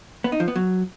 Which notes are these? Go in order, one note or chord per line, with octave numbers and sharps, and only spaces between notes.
B3
D#4
F3
B3
F#3